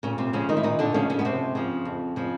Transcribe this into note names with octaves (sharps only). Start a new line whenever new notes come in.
A#2 C#3 C#4
C3 C4
C#3 F3 C#4
D#3 D#4
E4
A#2 D#3 D#4
D3 D4
C#3 F3 C#4
C#3 C#4
B3
F2 C3 C4
C#3 F3
F2
C#3 F3